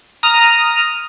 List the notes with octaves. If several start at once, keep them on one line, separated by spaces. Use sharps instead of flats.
A#5 D#6 F6